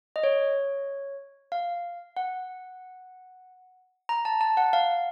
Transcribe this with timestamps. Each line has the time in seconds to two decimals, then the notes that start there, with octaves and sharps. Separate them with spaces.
0.16 D#5
0.24 C#5
1.52 F5
2.17 F#5
4.09 A#5
4.25 A5
4.41 A5
4.57 F#5
4.73 F5